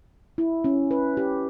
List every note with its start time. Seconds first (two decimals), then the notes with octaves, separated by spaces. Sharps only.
0.38 E4
0.64 C#4
0.91 B4
1.17 G4